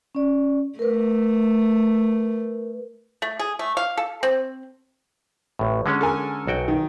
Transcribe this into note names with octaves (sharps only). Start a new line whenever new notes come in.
C#4 D5
A3 A#4 B4
A3
G#4
A3
F5
A4
C4
A1 A2
D3 G#3 C#4
A4 A#4 G#5
B1 F#4 G5
D#3